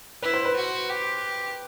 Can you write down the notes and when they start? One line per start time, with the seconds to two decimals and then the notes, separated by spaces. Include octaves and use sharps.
0.22 E4 B4
0.34 C5
0.45 B4
0.56 F#4
0.90 G4